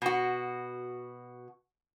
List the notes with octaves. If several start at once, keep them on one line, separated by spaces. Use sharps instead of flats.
B2 F#4